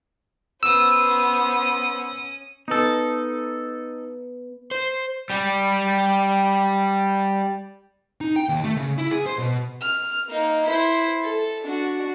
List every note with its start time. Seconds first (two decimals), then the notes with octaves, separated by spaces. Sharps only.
0.63 B3 C#4 C5 D#6 E6
2.68 B3 D#4 A4 B4
4.71 C5
5.30 G3 G4
8.21 D#4
8.36 G5
8.49 D#2
8.64 A3
8.77 C#3
8.98 E4
9.11 G#4
9.26 C5
9.39 B2
9.82 F6
10.29 A#3 D#4
10.66 E4 C5
11.23 A4
11.62 D4 F#4